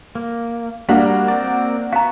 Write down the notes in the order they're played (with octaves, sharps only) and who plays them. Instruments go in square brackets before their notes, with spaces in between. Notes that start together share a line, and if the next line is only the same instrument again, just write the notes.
[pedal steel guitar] A#3
[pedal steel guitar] G3 [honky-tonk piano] A#3 D4 F#4 [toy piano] F5
[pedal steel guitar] C4 D5
[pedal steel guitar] B3 F#4 [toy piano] F5 A#5